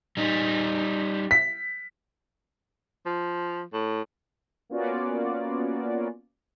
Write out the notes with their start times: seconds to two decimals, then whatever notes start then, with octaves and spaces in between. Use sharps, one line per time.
0.17 G3 D#4
1.31 B6
3.06 F3
3.73 A2
4.70 A#3 B3 C#4 F4 F#4 D5